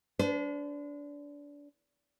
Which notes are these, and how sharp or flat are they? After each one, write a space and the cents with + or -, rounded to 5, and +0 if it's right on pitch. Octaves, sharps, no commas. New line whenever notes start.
D4 -25 C5 -45